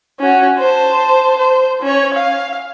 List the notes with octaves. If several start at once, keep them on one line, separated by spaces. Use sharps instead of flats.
C#4 F#4
C5 A5
C5
C#4 C#5
F5